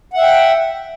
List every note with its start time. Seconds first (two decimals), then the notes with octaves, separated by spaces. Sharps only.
0.14 F#5
0.18 E5
0.22 G5